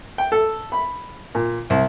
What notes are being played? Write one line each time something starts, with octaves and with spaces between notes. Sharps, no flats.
G5
A4
B5
A#2
C2